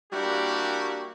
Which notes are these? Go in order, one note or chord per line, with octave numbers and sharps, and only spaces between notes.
G3 A#3 D4 E4 F#4 G4